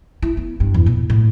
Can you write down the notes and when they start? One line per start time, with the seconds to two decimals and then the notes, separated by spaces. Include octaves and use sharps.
0.22 E4
0.37 B3
0.60 G2
0.74 E2
0.86 A#2
1.10 A2